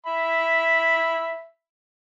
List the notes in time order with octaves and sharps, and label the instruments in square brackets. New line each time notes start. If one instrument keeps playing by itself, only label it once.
[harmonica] E5 B5